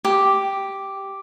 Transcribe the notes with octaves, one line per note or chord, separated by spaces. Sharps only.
G4